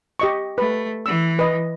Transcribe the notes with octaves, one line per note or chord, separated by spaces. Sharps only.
G4 D#5 C#6
A3 B4
E3 E6
B4 D#5